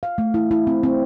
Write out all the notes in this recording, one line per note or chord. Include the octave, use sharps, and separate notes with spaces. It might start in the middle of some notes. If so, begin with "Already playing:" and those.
F5
A3
E4
E4
C4
C4